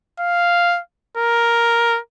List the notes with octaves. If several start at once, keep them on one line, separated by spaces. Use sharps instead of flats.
F5
A#4